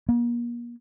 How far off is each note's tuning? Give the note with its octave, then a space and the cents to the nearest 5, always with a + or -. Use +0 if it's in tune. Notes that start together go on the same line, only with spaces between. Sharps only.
A#3 +40